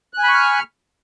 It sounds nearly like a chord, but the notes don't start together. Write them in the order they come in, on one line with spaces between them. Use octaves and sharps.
F#6 G#5 B5 C#6 F6